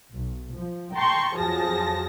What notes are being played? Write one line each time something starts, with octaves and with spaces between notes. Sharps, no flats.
B1
F3
G5 A5 A#5 C6 C#6
F2 F3 F#3 G#4 A5 A#6